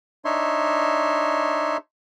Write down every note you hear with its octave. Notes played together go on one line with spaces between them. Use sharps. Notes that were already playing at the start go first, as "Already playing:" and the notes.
D4 D#4 C#5 E5 C6